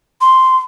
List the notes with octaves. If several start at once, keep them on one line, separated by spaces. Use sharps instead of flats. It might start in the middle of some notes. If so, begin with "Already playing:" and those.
C6